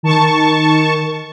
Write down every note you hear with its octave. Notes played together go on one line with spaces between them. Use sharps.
D#3 A5 C#6